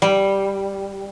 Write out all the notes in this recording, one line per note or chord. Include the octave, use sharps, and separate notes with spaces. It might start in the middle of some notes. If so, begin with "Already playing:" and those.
G3